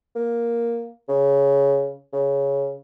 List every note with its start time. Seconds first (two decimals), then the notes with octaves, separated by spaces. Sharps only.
0.15 A#3
1.09 C#3
2.13 C#3